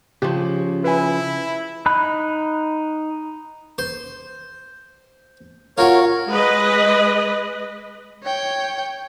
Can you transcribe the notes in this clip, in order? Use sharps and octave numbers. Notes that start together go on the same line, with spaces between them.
C#3 F3 G4
E4 B4 G#5
D#4 B5 F#6
C5
F4 F#4 A#4 C#5
G#3 B4 D#5
C#5 G5